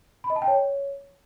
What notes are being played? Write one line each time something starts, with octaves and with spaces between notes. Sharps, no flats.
B5
D#5
A5
G5
C#5